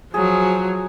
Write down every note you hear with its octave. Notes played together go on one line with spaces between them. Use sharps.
F3 F#3 G#4